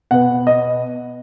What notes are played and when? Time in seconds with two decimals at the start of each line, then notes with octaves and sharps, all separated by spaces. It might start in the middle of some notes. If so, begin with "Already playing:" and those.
0.11 B2 B3 F#5
0.47 D#5